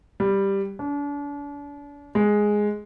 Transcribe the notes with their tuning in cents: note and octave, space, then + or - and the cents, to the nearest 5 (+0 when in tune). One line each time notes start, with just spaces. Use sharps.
G3 +5
D4 -40
G#3 +0